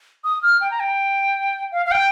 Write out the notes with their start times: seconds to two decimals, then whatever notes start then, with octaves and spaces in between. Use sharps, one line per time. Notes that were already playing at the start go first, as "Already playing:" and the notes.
0.24 D#6
0.43 F6
0.61 G5
0.71 A#5
0.80 G5
1.72 F5
1.86 F5
1.91 G5